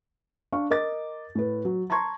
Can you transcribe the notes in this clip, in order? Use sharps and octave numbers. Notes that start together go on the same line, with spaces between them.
D4 F5 C#6
A#4 D#5 D6 A6
A2 B4
F#3
A5 A#5 C6 C#6 G#6